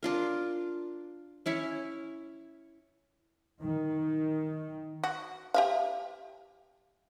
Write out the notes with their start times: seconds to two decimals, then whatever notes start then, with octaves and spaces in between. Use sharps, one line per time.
0.03 D4 F4 A#4
1.46 C#4 E4 C#5
3.62 D#3
5.04 F#4
5.54 G4 E5 F5